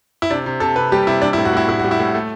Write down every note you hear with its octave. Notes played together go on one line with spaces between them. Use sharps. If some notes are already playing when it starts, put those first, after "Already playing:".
E4
C3 D4
C3
C3 A4
C3 B4
G3 G4
C3 E4
G3 D4
E4
A2
F#4
A2 E4
A2 E4
G3 F#4
E4
A2
A3